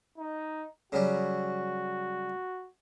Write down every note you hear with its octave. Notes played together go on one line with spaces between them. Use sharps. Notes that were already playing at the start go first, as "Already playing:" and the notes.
D#4
C#3 F#3 G3 F#4